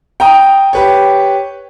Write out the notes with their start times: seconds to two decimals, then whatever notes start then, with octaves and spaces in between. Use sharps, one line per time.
0.20 G5 A#5 D#6
0.73 G4 B4 C#5